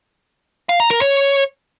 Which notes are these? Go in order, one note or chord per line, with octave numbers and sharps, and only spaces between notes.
F5
A#5
A#4
C#5